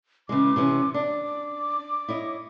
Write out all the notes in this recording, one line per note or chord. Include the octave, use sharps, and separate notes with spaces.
C#3 E3 G#3 D6
C3 E3 C#4
D4 D6
E4 C#5 D#5